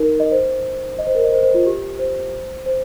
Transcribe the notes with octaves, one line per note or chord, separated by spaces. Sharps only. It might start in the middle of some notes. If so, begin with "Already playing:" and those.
Already playing: D#4 A#4
D#5
C5
D#5
C5
A#4
D#5
C5
C5
F4
G4
C5
C5